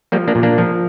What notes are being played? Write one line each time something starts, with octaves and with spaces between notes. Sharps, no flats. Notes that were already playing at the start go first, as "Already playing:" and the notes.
F3 G3 A#3
A#3 D4
A#2
A#3 D4
F3